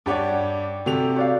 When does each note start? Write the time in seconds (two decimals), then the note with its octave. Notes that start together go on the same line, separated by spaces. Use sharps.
0.06 G2 G4 C#5 D5 F#5 D6
0.86 C3 F#4 G4 A4 F7
1.16 F#4 D5 F5